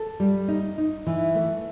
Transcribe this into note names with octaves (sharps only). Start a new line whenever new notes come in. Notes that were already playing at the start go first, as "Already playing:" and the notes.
Already playing: A4
G3
D#4
D#4
E3
A3